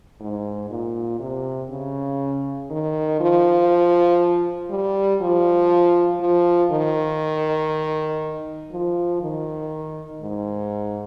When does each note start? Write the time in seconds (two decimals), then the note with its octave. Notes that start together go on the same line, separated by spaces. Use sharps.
0.20 G#2
0.70 A#2
1.20 C3
1.70 C#3
2.71 D#3
3.20 F3
4.70 G3
5.21 F3
6.21 F3
6.71 D#3
8.71 F3
9.22 D#3
10.22 G#2